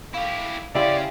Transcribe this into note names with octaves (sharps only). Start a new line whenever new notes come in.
E4 G4 A4 F5 C#6
C#3 C#4 E4 G4 D5 E5 F5 C6